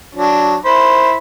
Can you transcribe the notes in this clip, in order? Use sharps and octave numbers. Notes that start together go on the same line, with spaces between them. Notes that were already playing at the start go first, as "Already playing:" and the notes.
F#3 D4
E4 C5 B5